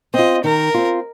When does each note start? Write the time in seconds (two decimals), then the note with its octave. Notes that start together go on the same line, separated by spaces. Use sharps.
0.14 C4 F4 D#5
0.44 D#3 A#4
0.74 C4 F4